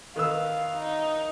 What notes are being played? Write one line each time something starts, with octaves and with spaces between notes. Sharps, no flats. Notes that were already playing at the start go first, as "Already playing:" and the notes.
D#3 B4 F5 E6
D#4